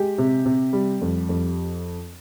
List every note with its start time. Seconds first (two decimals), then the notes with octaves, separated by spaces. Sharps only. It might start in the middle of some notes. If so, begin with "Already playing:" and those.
Already playing: G#3 G4
0.18 C3
0.45 C3
0.73 G3
1.01 F2
1.29 F2